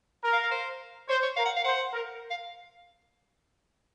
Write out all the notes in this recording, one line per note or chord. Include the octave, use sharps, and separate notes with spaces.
A#4
F5
F5
C5
C5 C#5
C#5
A#4 F5
F#5
F5
C5 F#5
A#4
F5